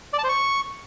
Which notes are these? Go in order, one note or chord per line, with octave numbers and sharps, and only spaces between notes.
D5
A5
C5
C#6